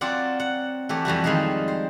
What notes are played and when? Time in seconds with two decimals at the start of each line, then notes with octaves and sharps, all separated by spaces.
0.01 F#3 C4 F4 D5 F#5
0.40 F#5
0.89 E3 A3 G4
1.05 F2 E3 G3 F#4
1.24 D#3 F3 G3 G#3 D#4
1.68 C5